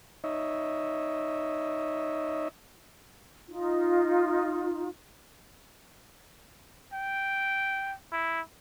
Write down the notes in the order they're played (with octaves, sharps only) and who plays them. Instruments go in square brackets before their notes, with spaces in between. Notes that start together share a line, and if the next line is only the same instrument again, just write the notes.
[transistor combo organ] D#4 C#5 D#5 E5
[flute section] D#4 F4
[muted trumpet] G5
E4